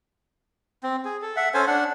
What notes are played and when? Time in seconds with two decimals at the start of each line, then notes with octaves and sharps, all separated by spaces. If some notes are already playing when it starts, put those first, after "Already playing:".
0.83 C4
1.05 G#4
1.22 A4
1.36 E5 F#5
1.54 C#4 A4 C5 G#5
1.67 D4 F#5